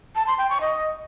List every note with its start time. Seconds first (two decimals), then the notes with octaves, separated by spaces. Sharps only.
0.15 A5
0.27 C6
0.38 G5
0.49 C#6
0.61 D#5